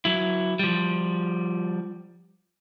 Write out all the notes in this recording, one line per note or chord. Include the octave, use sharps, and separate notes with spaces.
F#3 E4
F3 G3